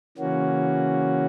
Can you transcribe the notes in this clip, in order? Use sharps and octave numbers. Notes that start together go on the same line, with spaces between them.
C#3 E3 A#3 C#4 F#4